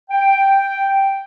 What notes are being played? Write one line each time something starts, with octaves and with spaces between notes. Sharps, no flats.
G5